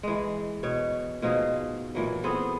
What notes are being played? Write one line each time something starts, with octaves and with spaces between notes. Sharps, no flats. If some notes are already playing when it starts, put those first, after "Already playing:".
E3 G#3
B2 C#5
B2 F3 D#4 G#4
A#2 E3 F#3
B3 C4 G#4 A4